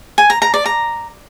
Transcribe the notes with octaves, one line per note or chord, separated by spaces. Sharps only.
G#5
A#5
A#5
D5
A#5